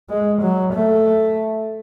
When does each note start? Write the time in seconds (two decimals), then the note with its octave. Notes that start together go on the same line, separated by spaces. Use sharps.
0.09 G#3
0.41 F#3
0.73 A3